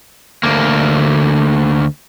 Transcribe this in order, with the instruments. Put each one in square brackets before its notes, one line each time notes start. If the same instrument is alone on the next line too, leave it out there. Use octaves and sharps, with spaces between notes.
[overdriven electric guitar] D2 A#3